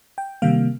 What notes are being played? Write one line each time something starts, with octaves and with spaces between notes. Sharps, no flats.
G5
C3 D#3 G3 A#3 F5